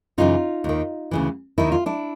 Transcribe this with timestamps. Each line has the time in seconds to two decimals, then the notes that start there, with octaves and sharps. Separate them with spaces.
0.18 F#2 C#3 E3 D#4 F4
0.64 D#2 D#3
1.11 D2 C#3 E3
1.58 D#2 D#3 E4
1.72 F4
1.86 D4 E4